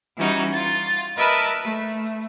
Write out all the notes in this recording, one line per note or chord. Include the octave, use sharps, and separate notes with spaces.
E3 G3 C#4 D#4 F#4
F4 A6
A#4 B4 D#5 E5 A5 B5
A3